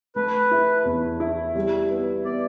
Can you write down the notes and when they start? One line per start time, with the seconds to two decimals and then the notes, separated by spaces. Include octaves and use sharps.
0.16 A3 B4
0.51 E4
0.85 E2
1.20 E4
1.55 G3
1.90 B3
2.25 B3 D5